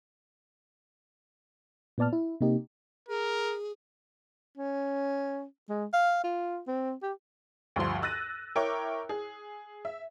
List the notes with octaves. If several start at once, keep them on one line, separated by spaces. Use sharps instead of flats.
A#2 B3 D5 A5 F6
E4
C3 A#3 D#4 G4
G#4 A#4
C#4
G#3
F5
F4
C4
G4
D2 G2 F3 C6
E6 F#6 A6 A#6 D#7
E4 A#4 C#5 G5 C#6 D6
G#4
E5